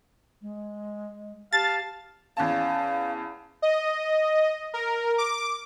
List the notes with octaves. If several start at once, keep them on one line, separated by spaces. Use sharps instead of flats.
G#3
G4 F5 A5 A6
E2 C#4 F5 A5
D#5
A#4
D6